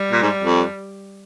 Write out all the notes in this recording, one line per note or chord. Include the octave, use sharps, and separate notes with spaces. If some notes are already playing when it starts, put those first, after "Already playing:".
Already playing: G3
A#2
G#2
F2